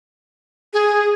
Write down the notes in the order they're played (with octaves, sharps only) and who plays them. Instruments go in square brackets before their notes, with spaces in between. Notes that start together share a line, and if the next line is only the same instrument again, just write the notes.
[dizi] G#4